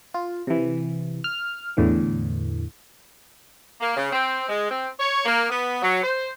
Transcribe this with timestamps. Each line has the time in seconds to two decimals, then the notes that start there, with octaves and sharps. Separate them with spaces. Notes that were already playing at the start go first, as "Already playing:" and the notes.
0.14 F4
0.47 C3 E3
1.24 F6
1.77 E2 A2 D3 E3
3.81 A#3
3.97 C#3
4.13 C4
4.49 G#3
4.71 C4
5.00 C#5
5.25 A#3
5.50 B3
5.83 F#3
6.04 C5